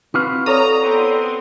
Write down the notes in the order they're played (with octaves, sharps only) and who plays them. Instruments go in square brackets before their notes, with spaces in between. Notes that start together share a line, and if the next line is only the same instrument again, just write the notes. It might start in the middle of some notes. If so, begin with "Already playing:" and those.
[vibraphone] C4 B4 [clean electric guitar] E4 F#4 F5
[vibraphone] A4 [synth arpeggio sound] C#5 D5 D#6 [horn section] A#5
[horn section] B3 C4